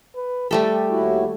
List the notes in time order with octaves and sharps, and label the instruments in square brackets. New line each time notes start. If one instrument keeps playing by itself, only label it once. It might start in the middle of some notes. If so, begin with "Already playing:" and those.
[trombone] B4
[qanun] G3 A3 A4 [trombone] G4
[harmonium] D#2 E4 F#4